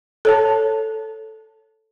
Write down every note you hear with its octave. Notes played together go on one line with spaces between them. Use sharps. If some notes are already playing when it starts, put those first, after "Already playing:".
A4 C#5 A5